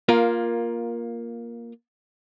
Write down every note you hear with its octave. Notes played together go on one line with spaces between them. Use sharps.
A#3 F4 A#4